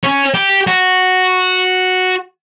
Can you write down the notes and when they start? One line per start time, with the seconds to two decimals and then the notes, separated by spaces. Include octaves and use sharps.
0.03 C#4
0.34 G4
0.67 F#4